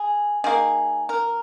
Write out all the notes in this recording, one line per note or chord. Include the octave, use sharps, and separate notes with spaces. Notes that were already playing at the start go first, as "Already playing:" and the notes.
Already playing: G#4
D#3 A#3 G#4
A#4